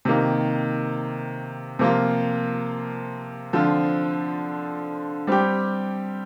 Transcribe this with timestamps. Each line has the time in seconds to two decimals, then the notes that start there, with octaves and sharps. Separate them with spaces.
0.05 C3 D#3 A#3
1.79 C3 F3 A#3 F4
3.53 D3 F3 C4 F4
5.27 G3 C4 G4